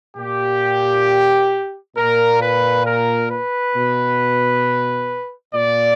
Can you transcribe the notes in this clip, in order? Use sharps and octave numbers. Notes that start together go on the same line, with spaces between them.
A#2 G4
A#2 A#4
B4
A#4
B4
B2
A#2 D5